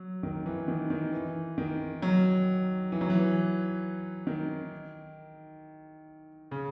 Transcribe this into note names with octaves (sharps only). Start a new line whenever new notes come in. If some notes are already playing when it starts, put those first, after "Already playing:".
Already playing: F#3
D#3
E3
D#3
D#3
E3
D#3
F#3
E3
F#3
E3
D#3
C#3